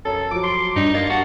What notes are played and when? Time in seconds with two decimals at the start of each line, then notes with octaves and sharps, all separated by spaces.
0.05 F#2 A4
0.31 F3 F#3 D6
0.43 C6
0.76 G2 D4 D#4
0.94 A#3 D#5 A6
1.10 G2 F#4 A5 C#7